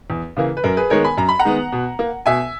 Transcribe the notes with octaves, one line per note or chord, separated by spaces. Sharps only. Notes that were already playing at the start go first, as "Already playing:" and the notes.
E2
C#3 E3 A#3
B4
F#2 A#4
G#4 B4
D#3 G#3 B3 A#4 C#5
G#5 B5
F#2 A#5
B5
F#5 A#5
D#3 G#3 B3
B2
A#3
B2 E5 G#5